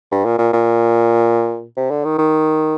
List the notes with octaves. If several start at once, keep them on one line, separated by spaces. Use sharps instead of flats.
G2
A#2
A#2
A#2
C3
D3
D#3
D#3